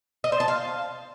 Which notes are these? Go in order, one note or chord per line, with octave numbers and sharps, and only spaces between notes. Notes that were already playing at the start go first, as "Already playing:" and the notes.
D#5
C5
A5
F5